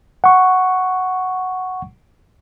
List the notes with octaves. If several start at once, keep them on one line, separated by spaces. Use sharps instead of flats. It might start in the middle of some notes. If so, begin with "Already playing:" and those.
F#5 C#6